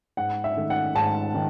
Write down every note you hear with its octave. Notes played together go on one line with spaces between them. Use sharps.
G#2 F#5
E5
D#3 A3
F#5
G#2 A5
D#3